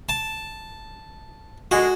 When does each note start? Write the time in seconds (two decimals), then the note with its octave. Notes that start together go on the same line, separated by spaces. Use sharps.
0.09 A5
1.71 D3 G#3 F#4